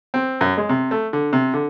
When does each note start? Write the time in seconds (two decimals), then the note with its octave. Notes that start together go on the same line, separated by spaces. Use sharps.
0.14 C4
0.41 F#2
0.57 G#3
0.69 C3
0.91 A3
1.13 D3
1.33 C3
1.54 D3